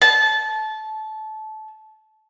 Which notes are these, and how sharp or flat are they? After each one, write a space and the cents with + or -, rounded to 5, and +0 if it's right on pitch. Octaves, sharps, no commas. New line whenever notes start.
A5 -20